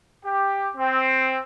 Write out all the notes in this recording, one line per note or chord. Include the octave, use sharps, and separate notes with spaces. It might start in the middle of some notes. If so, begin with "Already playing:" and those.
G4
C4